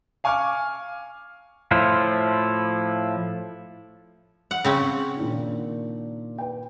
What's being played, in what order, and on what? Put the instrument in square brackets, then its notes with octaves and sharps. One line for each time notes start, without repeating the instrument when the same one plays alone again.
[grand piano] F5 G#5 C#6 D6 F6
[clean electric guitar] A2 F3 E4 F4
[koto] F#5
C#3 C4 C#4
[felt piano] A#2 D#3 D4
B4 G5